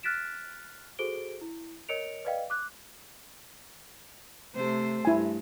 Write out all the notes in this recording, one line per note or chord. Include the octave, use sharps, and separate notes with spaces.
F6 F#6 A6 B6 D7 E7
F#4 G#4 A4 C5 D7 G7
E4
A#4 C#5 D#5 C#7 D7 F7
B4 D5 D#5 F5 G5
D6 F#6
C3 A3 C5
G2 E4 G#5